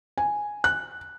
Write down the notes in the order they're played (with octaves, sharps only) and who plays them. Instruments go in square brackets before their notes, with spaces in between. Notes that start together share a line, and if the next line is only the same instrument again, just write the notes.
[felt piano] G#5
F#6